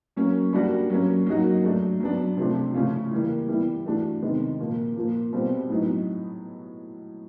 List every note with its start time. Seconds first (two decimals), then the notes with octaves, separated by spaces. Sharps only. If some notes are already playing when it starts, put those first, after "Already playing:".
0.16 F#3 A#3 C#4
0.53 G3 A#3 D4 F#4
0.90 F#3 A#3 C#4
1.26 F#3 A#3 D#4 F#4
1.63 F#3 A3 D4
2.00 F#3 B3 D4
2.37 C3 F3 A3 D4
2.74 C#3 F3 A3 C#4 F4
3.11 E3 G3 A#3
3.48 E3 G3 B3 E4
3.85 E3 A3 D4 F#4
4.22 C3 D#3 G#3 B3
4.59 A#2 F3 A#3
4.96 A#2 F3 A#3
5.33 B2 G3 C4 F4
5.70 A2 F#3 B3 D#4